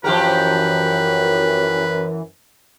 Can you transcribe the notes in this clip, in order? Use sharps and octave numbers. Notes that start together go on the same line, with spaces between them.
F#2 E3 F3 G4 A#4 B4